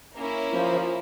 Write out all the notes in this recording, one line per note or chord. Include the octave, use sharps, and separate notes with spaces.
A#3 C#4 E4
F3